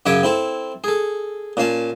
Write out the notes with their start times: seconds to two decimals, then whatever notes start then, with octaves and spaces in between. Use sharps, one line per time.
0.06 F#2 C#3 C#5 E5 D6 D#6
0.23 C4 E4 A4
0.84 G#4 A4
1.57 A#2 C#4 F5 A5